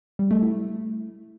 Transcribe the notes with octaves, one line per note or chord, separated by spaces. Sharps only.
G3
A3
E4